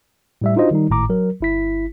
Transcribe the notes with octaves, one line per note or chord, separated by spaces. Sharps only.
A2 G3 E5
D4 D#4 F4 F#4 C5 D#5
D#3 G3 D#4
G#1 A2 A#5 D6
F#3 A#4
G1 E4 B6